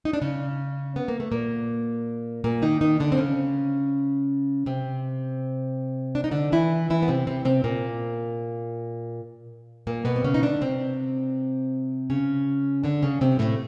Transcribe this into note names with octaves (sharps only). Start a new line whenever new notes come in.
D#4
D4
C#3 C#4
B3
A#3
A3
A#2 A#3
A#2 A#3
D#3 D#4
D#3 D#4
D3 D4
C4
C#3 C#4
C3 C4
D4
D#4
D3 D4
E3 E4
E3 E4
B3
C3 C4
C3 C4
C3 C4
A#2 A#3
A#2 A#3
B2 B3
C4
C#3 C#4
D#4
D3 D4
C3 C4
C#3 C#4
D3 D4
C#3 C#4
C3 C4
A2 A3